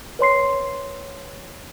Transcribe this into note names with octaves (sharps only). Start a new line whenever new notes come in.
B4 C#5 C6 C7